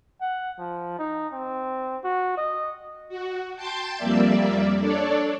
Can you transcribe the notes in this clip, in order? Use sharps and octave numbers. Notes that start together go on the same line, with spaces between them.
F#5
F3
D#4
C4
F#4
D#5
F#4
G5 A5 C6 G6 A6
F2 G3 A#3 D5 E5
D4 A4 C#5 D5